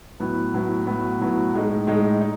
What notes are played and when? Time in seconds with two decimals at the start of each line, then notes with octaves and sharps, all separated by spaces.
0.20 A2 F#3 B3 E4
0.54 A2 F#3 B3 E4
0.86 A2 F#3 B3 E4
1.20 A2 F#3 B3 E4
1.53 A2 G#3 D#4
1.87 A2 G#3 D#4
2.21 D#4